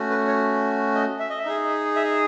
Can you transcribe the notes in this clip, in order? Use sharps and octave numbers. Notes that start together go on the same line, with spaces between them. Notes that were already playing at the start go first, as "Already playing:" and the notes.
Already playing: A3 C#4 F#4
B4
C#5
D#5
E5
D#5
E5
D#4 G#4
E5